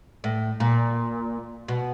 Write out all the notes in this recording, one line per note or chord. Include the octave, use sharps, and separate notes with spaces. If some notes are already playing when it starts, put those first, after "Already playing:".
A2
A#2
B2